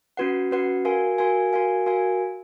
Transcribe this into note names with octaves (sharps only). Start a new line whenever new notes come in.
C#4 F#4 B4 F#5
C#4 F#4 B4 F#5
F#4 A#4 F5 G#5
F#4 A#4 F5 G#5
F#4 A#4 F5 G#5
F#4 A#4 F5 G#5